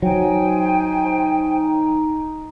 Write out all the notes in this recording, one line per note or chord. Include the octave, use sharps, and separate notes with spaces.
F#3 D#4 C5 G5 G#5